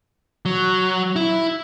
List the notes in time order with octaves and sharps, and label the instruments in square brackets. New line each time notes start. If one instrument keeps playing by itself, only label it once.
[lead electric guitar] F#3
E4